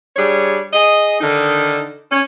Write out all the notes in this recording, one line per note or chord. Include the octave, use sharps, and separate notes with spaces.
G3 D4 G#4 C#5
G#4 D#5
D3 D#3 D#4
C#4